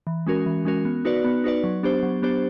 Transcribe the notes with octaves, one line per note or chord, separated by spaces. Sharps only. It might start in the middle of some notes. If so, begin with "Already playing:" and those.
E3
G#3 C#4 F#4 A#4
E3
G#3 C#4 F#4 A#4
B3
D#4 F#4 B4 D5
B3
D#4 F#4 B4 D5
F#3
B3 D4 G4 C5
F#3
B3 D4 G4 C5